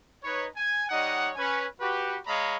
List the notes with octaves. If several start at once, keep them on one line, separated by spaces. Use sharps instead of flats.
D#4 B4 C#5
G#5
G3 D#4 C#5 D#5 F#5
C#4 B4 G#5
F#4 G4 B4
G#3 C#5 D#5 F5 A#5 B5